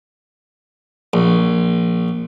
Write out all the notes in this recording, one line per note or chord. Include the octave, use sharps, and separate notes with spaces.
A#1